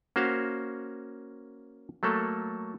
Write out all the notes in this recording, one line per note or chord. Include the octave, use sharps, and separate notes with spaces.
A#3 C#4 F#4 C5 F5
F#3 A3 A#3 A4